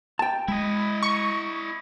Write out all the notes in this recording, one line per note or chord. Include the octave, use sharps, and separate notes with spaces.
G5 A5
G#3 E4 D#5
C#6